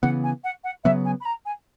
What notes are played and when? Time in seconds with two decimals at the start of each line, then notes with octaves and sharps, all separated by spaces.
0.03 C#3 E3 B3 F#5
0.24 G#5
0.44 F#5
0.64 F#5
0.84 C#3 F#3 B3 E5
1.05 G#5
1.20 B5
1.25 A#5
1.45 G#5